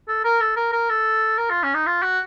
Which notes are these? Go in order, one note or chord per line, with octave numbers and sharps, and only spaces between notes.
A4
A#4
A4
A#4
A#4
A4
A#4
F4
C#4
D#4
F4
F#4